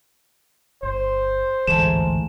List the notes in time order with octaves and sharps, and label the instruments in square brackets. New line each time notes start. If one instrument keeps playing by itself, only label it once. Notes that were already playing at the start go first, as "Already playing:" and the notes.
[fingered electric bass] G1 [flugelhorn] C5
[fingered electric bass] A1 D2 E3 [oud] G#2 A3 [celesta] E7